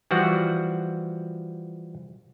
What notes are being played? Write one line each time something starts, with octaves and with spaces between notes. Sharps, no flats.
E3 F3 G3 F#4 F#5